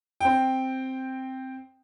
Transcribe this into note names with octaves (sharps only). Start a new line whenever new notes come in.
C4 G5